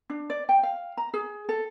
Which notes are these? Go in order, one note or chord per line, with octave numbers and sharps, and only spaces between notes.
D4
D5
G5
F5
A#5
G#4
A4